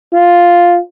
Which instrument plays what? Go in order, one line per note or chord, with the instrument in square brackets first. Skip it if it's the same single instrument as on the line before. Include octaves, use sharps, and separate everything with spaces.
[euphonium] F4